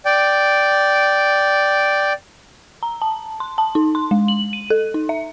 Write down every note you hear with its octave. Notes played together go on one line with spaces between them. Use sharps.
D5 G5
A#5
A5
C6
A5
D#4
C6
G#3
F#7
D#7
A4
D#4
E5